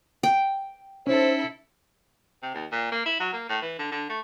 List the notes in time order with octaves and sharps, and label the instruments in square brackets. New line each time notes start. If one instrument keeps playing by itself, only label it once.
[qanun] G5
[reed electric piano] C#4 D#4 [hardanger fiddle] E4 A4 [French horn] C5
[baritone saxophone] C3
D#2
A#2
A#3
E4
F#3
A#3
A2
E3
D3
D3
A3